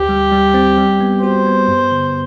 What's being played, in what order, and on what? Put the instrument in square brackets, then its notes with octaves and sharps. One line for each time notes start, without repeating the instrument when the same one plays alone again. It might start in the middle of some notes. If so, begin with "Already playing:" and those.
Already playing: [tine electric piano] D2 [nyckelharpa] G4
[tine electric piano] G3
G3
C4
G3
B3
[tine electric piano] F#4 [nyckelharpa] C5
[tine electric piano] B3
G2
D3